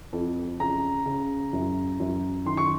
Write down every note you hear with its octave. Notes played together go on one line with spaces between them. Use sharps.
F2
C#3 A#5
C#3
F#2
F#2
D#3 C6
C#6